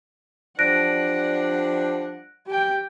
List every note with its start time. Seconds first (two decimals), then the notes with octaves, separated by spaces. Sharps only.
0.59 F3 G3 D4 F#5 F#6 A#6 D7
2.46 G4 G5